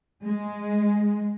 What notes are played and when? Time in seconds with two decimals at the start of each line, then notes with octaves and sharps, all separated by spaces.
0.24 G#3